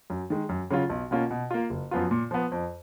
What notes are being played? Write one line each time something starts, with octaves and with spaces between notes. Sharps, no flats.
F#2
D#3 G#3
F#2
C#3 F#3 C#4 F4
B1
B2 A#3 C#4 F4
B2
A#3 F4
F#1
F#2 F3 B3 F4
A#2
F3 B3
F2